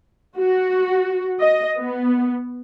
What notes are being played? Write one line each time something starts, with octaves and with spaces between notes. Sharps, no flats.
F#4
D#5
B3